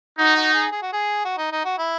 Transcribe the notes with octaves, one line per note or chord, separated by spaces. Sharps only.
D#4 F#4
F#4
G#4
G#4
F#4
G#4
F#4
D#4
D#4
F#4
E4